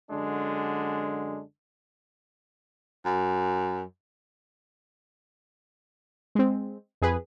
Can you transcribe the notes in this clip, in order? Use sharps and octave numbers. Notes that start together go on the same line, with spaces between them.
F#2 D3 G#3 D4
F#2
G#3 C4
F2 G#4 B4